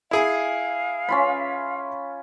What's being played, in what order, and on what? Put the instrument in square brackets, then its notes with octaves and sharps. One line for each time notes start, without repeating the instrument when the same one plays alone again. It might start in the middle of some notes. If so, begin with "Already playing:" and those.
[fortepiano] E4 G#4 G#5 [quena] F5
[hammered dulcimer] C#4 F4 B5